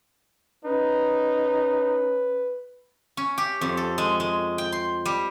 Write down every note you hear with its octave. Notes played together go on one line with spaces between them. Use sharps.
C#4 D#4 B4
C#4
G4
F2
A4
G#3
G#3
G5
C6
G3